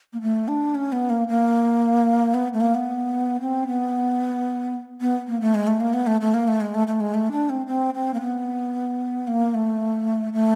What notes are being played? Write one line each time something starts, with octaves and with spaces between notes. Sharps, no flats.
A#3
A3
D4
C#4
B3
A#3
A#3
B3
A3
A#3
B3
C4
B3
B3
A#3
A3
G#3
A3
A#3
B3
A3
A3
A#3
A3
G#3
A3
A3
G#3
A3
D4
C4
C4
C4
A#3
B3
A#3
A3
A3